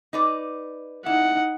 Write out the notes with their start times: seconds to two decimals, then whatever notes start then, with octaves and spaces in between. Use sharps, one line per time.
0.13 D#4 B4 D5
1.06 D#4 E4 F#5